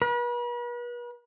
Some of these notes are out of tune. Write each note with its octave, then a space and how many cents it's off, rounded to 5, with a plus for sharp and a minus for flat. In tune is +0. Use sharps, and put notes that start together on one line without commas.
B4 -40